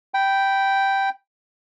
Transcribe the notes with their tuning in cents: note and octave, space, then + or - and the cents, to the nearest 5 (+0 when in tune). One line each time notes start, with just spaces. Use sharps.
G5 -5 B5 +0